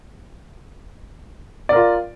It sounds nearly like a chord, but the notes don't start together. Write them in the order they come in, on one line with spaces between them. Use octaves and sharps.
D5 A#4 F4